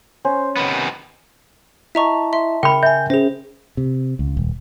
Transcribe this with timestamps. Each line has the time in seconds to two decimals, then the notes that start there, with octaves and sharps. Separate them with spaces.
0.25 C#4 C5
0.56 C3 D#3 B3 B4
1.95 E4 D#5 E5 A5 A#5 C#6
2.33 E5 C6
2.63 C#3 A#4 G5 B5
2.83 E5 G#5 G6
3.10 C#4 G#4 C5
3.77 C3
4.19 C#2
4.37 D#1